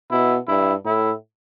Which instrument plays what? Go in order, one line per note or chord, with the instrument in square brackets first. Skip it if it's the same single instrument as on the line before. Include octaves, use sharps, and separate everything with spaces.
[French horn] B2 [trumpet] E4
[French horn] G2 [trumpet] E4
[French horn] A2 [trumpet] E4